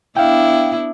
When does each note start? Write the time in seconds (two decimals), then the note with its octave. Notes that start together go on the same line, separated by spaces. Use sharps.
0.17 B3 D4 E4 F5 G5